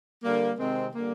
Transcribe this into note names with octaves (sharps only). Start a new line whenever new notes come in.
D3 G3 A#3
C3 D#3 G#3 C4
D3 G3 A#3